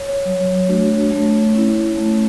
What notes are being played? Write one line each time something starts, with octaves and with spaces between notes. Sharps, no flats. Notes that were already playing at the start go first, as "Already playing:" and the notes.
Already playing: C#5
F#3
A3 D4 F#4
A3
C#4 E4
A3